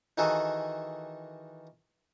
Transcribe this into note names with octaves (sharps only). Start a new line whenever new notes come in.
D#3 E3 D#4 F#4 G#4 A4